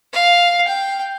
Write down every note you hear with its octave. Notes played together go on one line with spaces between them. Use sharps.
F5
G5